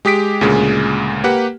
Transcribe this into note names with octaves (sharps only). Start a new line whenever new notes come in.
G#3 G4 D#6 B6 D7
D2 A#2 C#3 G#3
A#3 G4 B4 F#5